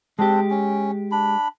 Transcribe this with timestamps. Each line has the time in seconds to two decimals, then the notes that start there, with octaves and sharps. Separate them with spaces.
0.19 G#3 C4 D4 G4
0.51 C#4
1.12 D4 B5